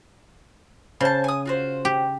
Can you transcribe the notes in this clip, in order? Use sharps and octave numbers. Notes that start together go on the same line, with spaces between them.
C#3 C5 A5
G#5 D#6
F4 F#4 C5
G4